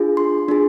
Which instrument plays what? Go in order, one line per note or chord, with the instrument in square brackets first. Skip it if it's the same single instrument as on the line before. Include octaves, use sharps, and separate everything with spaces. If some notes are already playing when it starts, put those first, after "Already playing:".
Already playing: [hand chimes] D4 F4 G#4
C6
D4 F4 G#4